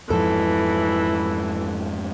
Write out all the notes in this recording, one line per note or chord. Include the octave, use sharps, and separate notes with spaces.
F2 G#2 E3 F3 A4